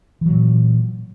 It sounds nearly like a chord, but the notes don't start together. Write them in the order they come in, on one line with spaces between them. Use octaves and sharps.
E3 F#3 A#2